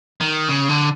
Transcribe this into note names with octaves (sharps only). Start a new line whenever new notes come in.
D#3
C#3
D3